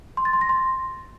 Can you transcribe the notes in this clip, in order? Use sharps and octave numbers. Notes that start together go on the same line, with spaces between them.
C6
A6
C6
A#6
C6